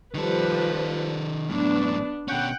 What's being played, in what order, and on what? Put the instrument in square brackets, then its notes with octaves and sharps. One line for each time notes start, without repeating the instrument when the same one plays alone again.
[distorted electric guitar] D#3 A4 [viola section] F3 G3 B4
[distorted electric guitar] F#2 A2 [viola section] B3 D4
[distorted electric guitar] B2 C#4 [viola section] F#5 G5